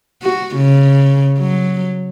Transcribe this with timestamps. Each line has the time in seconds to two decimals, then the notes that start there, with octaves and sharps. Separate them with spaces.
0.22 F#4
0.56 C#3
1.39 F#3